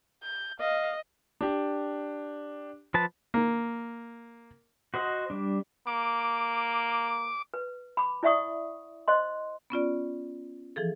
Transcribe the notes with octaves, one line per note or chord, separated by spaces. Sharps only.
G6
D#5 F5
D4 G4
F3 B4 A5
A#3
F#4 C5 D#5 F#5
G3 D4
A#3 D6
B4
B5 D6
E4 D5 E5 F#5 C#6 D#6
C5 D#5 C6
B3 C#4 F4 D5
E3 F3 G#4 A4